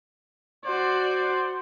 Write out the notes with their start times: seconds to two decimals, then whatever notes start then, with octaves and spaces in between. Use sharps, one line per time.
0.65 F#4 C5 D5